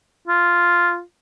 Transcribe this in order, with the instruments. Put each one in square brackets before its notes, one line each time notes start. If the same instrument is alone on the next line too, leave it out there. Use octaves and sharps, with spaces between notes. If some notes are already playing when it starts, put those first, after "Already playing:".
[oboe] F4